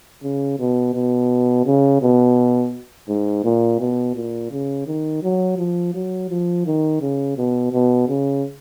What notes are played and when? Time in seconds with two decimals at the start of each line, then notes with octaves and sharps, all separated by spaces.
0.23 C#3
0.59 B2
0.94 B2
1.66 C#3
2.02 B2
3.09 G#2
3.44 A#2
3.80 B2
4.16 A#2
4.52 C#3
4.87 D#3
5.23 F#3
5.58 F3
5.94 F#3
6.30 F3
6.66 D#3
7.01 C#3
7.37 B2
7.73 B2
8.09 C#3